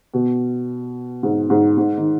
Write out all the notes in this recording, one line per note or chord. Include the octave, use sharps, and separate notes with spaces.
B2
G#2
G#2
G#2
D#3